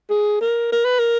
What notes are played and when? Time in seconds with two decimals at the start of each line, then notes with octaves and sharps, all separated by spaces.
0.10 G#4
0.41 A#4
0.72 A#4
0.85 B4
0.99 A#4